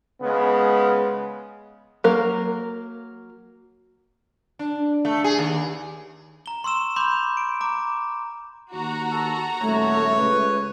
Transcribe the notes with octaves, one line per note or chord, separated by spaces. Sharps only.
C#3 G#3 B3
F#3 A#3 A#4
D4
A3
G#4
D#2
A#5 G7
C6 C#6 E6 E7
B5 C6 D6 G6
D7
A#5 D6
D#2 F#4 A#5
A4
D#1 A3 C#5
C#2 B4